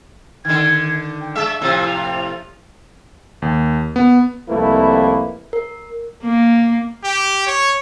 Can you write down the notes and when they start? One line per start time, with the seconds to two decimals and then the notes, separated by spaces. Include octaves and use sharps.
0.45 D3 D#3 G#6
1.21 G5
1.35 G#3 E5 E6
1.61 A2 C3 F3
1.87 F7
3.42 D#2
3.96 B3
4.48 C2 F2 A3 A#3 E4 B4
5.53 A#4
6.23 A#3
7.04 G4
7.47 C#5